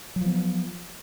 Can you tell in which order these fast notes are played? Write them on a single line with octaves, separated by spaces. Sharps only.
F#3 F3 B3